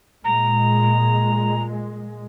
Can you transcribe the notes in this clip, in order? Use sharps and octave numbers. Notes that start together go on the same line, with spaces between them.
A#2 G#3 A#5